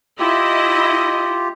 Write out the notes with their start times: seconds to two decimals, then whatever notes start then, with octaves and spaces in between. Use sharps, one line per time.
0.20 E4 F4 G4 D#5